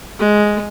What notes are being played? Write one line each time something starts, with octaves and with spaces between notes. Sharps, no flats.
G#3